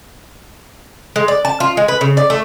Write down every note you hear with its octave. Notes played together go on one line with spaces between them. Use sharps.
G#3
D5
A5
F4
G#3
B4
C#3
D5
A3